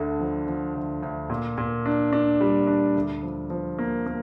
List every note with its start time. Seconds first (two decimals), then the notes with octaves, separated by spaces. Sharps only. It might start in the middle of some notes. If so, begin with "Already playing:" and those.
Already playing: D2 D3
0.20 F3
0.48 F3
0.75 D2
1.03 D2
1.30 A#2
1.58 A#2
1.86 D4
2.13 D4
2.41 G3
2.67 D4
2.96 D2
3.23 F3
3.50 F3
3.79 A#3
4.06 A#3